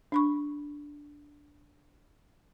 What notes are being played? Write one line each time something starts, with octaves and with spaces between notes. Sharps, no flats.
D4 B5 C#6